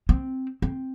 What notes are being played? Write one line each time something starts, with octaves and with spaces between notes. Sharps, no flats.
C4
C4